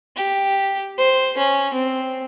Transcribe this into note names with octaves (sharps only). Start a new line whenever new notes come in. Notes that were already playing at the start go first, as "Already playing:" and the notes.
G4
C5
C#4
C4